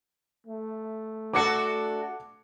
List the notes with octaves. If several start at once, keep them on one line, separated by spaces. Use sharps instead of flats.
A3
D4 F#4 A4 D6 C#7